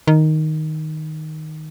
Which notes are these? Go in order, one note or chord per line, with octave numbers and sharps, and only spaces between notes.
D#3